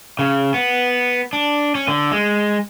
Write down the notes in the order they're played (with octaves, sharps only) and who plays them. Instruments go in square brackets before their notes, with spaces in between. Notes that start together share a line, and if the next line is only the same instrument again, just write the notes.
[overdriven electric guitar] C#3
B3
D4
C#4
D3
G#3